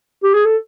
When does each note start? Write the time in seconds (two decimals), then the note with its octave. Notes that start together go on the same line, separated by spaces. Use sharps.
0.23 G4
0.34 G#4
0.45 A4